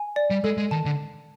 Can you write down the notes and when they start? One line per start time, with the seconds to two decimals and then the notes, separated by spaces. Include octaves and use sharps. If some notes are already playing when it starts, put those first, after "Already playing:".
Already playing: G#5
0.16 D5
0.30 G3
0.44 G#3 A4
0.58 G#3
0.71 D#3 A5
0.86 D3